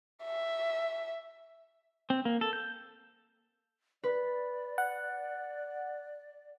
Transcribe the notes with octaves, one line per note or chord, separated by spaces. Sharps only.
E5
C4
A#3
A4
G6
B4 D5
F#5